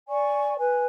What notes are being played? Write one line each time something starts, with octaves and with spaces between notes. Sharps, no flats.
D5 G#5 C#6
B4 G#5